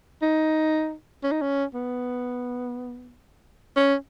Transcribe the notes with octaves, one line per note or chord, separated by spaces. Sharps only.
D#4
C#4
D#4
C#4
B3
C#4